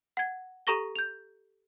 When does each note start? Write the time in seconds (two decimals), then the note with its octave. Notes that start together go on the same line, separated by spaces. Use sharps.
0.17 F#5 G#6
0.67 G4 A4 A#5 C#6 A#6 G7
0.96 G6 F7